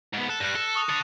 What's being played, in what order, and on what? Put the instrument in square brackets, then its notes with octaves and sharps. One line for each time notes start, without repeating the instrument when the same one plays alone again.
[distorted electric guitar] G#2 B3
[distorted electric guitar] A4 [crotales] F#6 E7
[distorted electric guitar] G2 G3 [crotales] F#6 A#6
[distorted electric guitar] A4
[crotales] C#6 D#6 F7
[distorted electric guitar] A4 D5